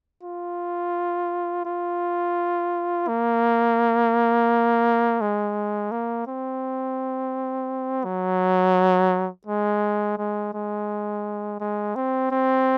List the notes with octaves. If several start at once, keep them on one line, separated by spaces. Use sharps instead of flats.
F4
F4
A#3
G#3
A#3
C4
F#3
G#3
G#3
G#3
G#3
C4
C4